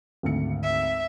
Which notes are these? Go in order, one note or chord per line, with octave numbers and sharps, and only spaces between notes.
G#1 D2 C#7
E5